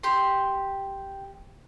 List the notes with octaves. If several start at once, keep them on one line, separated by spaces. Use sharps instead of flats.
G4 C6